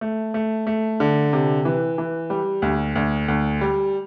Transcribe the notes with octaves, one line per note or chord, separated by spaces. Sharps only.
A3
A3
A3
D3
C3
E3
E3
G3
D2
D2
D2
G3